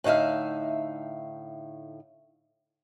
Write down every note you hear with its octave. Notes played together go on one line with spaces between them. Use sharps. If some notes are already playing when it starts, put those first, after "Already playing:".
A2 D3 D#4 E5 F5